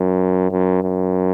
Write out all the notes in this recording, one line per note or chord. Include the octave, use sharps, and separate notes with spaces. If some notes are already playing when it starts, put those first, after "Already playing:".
Already playing: F#2
F#2
F#2